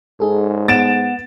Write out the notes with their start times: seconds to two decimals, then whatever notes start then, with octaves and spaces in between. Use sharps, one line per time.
0.20 G#2 D#4 G#4 A4
0.68 B3 A6 D7 E7